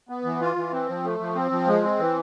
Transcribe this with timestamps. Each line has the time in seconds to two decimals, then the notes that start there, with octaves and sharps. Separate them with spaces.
0.09 B3
0.25 E3
0.41 F4
0.56 E3
0.73 C4
0.89 F3
1.04 A3
1.19 F3
1.35 C4
1.51 F3
1.67 G#3
1.84 C4
1.99 E3